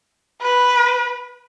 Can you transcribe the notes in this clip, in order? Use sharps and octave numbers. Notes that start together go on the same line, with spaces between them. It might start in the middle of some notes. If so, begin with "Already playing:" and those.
B4